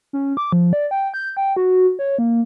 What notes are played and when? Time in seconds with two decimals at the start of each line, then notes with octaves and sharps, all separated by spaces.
0.13 C#4
0.37 D6
0.52 F3
0.73 D5
0.91 G5
1.14 G6
1.37 G5
1.56 F#4
1.99 C#5
2.18 A#3